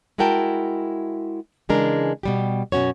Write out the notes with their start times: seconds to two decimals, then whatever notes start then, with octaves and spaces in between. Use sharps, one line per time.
0.18 G#3 E4 F#4 A#4 G5 A5
1.69 C#3 E3 G#3 D4 A#4
2.23 B2 G3 G4
2.72 F#2 B2 C#4 F#4 C#5